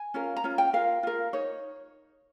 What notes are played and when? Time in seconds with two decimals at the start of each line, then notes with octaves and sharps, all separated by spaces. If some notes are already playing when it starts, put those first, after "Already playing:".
Already playing: G#5
0.14 C#4 F4 A#4
0.36 A#5
0.44 C#4 F4
0.58 G5
0.73 F4 A#4 F5
1.03 F4 A#4
1.33 D#4 C#5